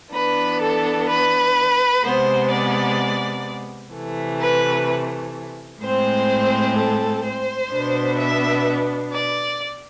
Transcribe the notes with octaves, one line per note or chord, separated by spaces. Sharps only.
E3 B3 D4 B4
A4
B4
C3 G#3 B3 C5
D5
C3 E3 A3
B4
A2 G#3 C4 C5
A4
C5
B2 B3 D4
E5
D5